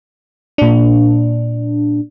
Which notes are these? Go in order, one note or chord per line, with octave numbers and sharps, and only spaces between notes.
A#2 D4